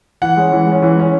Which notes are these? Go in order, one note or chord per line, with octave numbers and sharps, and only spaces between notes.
E3 F#5
G#3 C#4
E3
G#3 C#4
E3
G#3 C#4